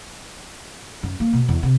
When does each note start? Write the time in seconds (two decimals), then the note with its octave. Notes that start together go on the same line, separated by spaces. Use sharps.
1.03 F#2
1.20 A#3
1.33 B2
1.49 E2
1.63 C3